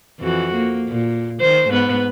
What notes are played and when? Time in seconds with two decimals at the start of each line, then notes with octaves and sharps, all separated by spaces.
0.19 F2 E3 F#4
0.55 A#3
0.88 A#2
1.40 D#3 C5
1.70 G#2 B3 B4